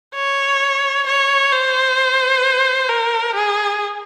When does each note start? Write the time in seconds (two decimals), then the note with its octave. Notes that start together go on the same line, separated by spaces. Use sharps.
0.15 C#5
1.07 C#5
1.52 C5
2.89 A#4
3.34 G#4